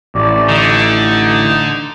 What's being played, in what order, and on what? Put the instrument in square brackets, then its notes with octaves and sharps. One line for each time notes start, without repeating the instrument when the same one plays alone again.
[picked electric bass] A1 [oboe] D5
[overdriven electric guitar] D3 [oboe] D#4